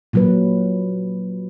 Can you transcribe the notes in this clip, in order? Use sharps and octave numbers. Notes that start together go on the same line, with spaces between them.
A#2 F#3 B4